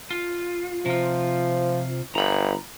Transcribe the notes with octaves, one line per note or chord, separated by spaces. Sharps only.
F4
C3 F3 F4
G1 A#5 B5